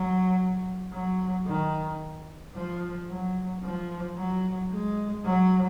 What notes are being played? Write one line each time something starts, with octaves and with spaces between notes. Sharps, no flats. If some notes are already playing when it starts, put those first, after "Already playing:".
Already playing: F#3
F#3
D#3
F3
F#3
F3
F#3
G#3
F#3